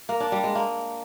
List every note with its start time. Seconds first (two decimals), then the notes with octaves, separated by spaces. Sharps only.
0.09 A#3
0.20 D4
0.32 G3
0.44 G#3
0.55 A#3